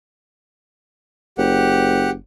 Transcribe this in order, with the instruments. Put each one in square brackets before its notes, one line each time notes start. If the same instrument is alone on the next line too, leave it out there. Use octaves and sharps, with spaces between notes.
[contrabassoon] F#1 [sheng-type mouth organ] G4 F#5